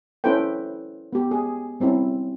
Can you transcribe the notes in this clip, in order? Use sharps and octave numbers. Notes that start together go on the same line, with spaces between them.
C#4 E4 A4 B4 C5 G5
B3 G4
G#4
G3 C4 C#4 E4